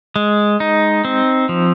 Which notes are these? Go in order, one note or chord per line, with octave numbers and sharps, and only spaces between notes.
G#3
D#4
C4
F3